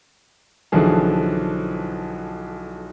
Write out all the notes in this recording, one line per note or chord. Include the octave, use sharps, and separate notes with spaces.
B1 D3 E3 F3 G#4